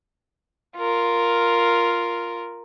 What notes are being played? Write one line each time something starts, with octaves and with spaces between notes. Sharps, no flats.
F4 A#4